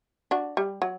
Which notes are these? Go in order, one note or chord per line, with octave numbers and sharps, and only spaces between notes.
D4 F#4
G3
F#3